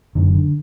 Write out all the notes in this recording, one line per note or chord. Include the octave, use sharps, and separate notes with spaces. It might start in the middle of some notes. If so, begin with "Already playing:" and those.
F#1 F#2 D3 D#3
D3